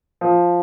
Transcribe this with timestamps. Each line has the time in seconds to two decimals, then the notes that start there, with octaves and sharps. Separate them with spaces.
0.21 F3